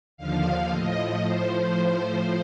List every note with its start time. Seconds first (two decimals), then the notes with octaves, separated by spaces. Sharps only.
0.17 D#2 D3 F3 F5
0.71 A2 F3 D#5
1.24 A2 F3 C5
1.77 A2 F3